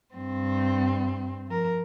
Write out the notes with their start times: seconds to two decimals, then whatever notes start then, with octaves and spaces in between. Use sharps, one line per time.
0.15 G2 C4
1.47 F3 A#4